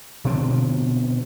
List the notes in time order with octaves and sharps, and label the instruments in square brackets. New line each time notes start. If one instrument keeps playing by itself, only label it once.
[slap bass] B2 D3 F3 C4